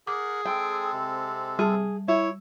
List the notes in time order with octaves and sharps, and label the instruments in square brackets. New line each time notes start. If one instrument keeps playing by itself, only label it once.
[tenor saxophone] G#4 [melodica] A#4 F#5 [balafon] D6
[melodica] G#3 C4 A4 [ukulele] G5
[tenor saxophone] C3
[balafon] G3 A5 [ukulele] G#4
[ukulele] E4 [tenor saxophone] C#5